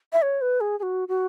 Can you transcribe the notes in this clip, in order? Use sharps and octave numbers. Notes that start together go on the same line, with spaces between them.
E5
C#5
B4
G#4
G#4
F#4
F#4